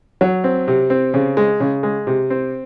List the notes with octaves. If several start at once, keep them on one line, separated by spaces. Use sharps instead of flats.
F#3
C4
C3
C4
C#3
G#3
C#3
G#3
C3
C4